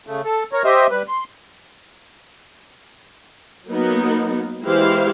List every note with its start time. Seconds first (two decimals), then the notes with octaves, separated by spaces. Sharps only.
0.07 C#3 A3
0.24 A4
0.53 A#4 C#5
0.64 G4 C5 D#5 E5
0.90 G3 B4
1.08 C6
3.68 F#3 A#3 B3 D#4
4.63 E3 G#3 E4 G4 C5 F5